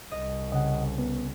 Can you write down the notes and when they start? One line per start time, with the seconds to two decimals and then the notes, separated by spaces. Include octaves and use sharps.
0.11 C2 D#5
0.52 C#3 D#5 F#5
0.98 B3